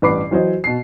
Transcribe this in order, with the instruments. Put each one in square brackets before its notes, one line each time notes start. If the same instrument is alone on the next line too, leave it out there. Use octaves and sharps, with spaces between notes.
[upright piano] A1 G2 B4 B5 D6 C7
E3 F#3 C5 D#5
B2 C7